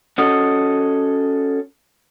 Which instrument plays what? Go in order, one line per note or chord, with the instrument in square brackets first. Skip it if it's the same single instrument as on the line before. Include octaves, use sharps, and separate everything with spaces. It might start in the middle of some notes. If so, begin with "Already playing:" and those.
[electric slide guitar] C#4 F#4 A4 D#5